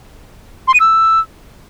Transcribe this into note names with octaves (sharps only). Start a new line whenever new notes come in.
C6
D#7
E6